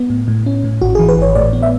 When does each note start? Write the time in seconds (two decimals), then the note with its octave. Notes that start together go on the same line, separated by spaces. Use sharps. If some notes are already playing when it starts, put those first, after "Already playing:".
Already playing: B3
0.10 A2
0.28 A2
0.46 C#4
0.64 A2
0.81 G#1 F#4
0.95 G#4
0.99 E3
1.09 B4
1.18 G#1 C#5
1.35 A2 D5
1.53 B3
1.63 E5